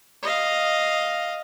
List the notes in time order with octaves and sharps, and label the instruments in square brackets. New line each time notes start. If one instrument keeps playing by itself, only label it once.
[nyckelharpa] D#5 F5